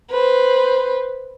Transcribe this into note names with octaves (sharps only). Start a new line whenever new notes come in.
B4 C5